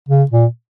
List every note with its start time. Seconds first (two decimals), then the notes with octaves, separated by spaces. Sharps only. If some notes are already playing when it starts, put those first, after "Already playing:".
0.09 C#3
0.31 A#2